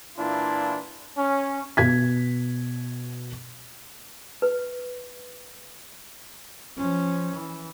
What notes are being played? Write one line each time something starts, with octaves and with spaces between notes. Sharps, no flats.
A#2 E3 D4 E4 F4
C#4
B2 G#6 B6
B4
F3 C#4
E3